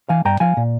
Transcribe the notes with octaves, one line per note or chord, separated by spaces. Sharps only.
E3 F5 G#5
G2 G5 A#5
F3 F5 G#5
A#2